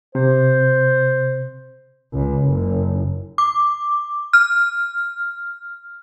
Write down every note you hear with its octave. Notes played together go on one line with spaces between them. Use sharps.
C3 C5
C#2
F#1
D6
F6